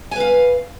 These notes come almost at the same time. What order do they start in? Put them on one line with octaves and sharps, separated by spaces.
G#5 B4 F5